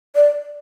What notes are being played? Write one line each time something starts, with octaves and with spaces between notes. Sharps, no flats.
D5